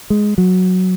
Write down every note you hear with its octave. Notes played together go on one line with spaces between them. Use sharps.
G#3
F#3